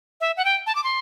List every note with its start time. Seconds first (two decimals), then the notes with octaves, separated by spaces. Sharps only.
0.21 E5
0.37 F#5
0.45 G5
0.67 A5
0.75 D6
0.84 C6